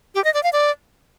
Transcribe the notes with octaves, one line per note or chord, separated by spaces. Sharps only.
G4
D#5
D5
F5
D5